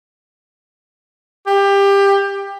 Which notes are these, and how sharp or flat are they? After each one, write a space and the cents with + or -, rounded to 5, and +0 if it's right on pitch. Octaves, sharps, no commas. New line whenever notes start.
G4 +20